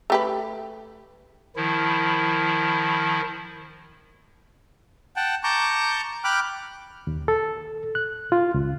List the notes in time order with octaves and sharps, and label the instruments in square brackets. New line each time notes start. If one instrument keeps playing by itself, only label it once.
[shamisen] A3 G4 B4
[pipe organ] D#3 F3 E4
[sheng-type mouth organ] F#5 G5 A5
A5 A#5 C#6 D6 G6
G5 B5 D6 F6 F#6
[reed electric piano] D#2
A4
F#6
F4
C#2